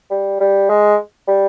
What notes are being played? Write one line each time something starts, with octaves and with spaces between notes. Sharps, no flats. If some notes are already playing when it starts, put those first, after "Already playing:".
G3
G3
G#3
G3